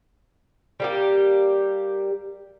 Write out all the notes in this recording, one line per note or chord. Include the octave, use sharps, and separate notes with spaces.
G3 A#3 G4